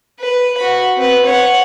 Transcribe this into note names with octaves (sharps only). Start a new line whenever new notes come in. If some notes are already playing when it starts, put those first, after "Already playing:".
B4
F#4 B5
C4 B4
C#5 F#5